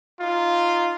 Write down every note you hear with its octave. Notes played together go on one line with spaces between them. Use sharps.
D#4 F4